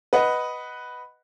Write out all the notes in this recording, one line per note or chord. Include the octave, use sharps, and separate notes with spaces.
B4 D#5 F#5